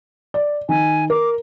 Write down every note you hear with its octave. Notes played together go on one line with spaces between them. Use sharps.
D5
D#3 G#5
A#4 D6